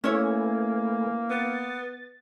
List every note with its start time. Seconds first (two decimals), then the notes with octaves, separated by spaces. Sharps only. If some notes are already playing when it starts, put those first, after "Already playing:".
0.04 A3 A#3 C#4 E4 B4 C#5 G#5
1.30 B3 A6